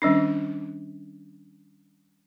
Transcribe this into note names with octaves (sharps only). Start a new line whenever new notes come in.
D#3 G3 C#4 D4